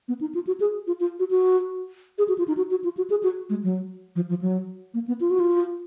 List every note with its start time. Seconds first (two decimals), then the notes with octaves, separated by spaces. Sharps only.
0.08 B3
0.21 D#4
0.35 F4
0.47 F#4
0.60 G#4
0.87 F4
1.00 F4
1.19 F#4
1.30 F#4
2.18 G#4
2.28 F#4
2.38 F4
2.48 D#4
2.57 F#4
2.71 F#4
2.84 F4
2.97 F#4
3.10 G#4
3.23 F#4
3.49 G#3
3.63 F#3
4.16 F3
4.29 F3
4.41 F#3
4.94 A#3
5.08 B3
5.21 F4
5.31 F#4
5.40 F4